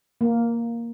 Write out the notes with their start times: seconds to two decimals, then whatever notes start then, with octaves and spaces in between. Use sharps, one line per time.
0.21 A#3